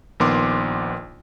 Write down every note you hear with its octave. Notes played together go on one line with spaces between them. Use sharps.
A#1 D#3 B3 C6 D6